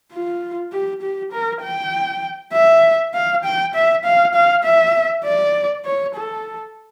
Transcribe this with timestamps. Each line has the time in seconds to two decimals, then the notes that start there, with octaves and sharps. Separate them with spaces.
0.13 F4
0.72 G4
1.02 G4
1.32 A#4
1.62 G5
2.53 E5
3.14 F5
3.44 G5
3.74 E5
4.04 F5
4.34 F5
4.64 E5
5.24 D5
5.85 C#5
6.15 A4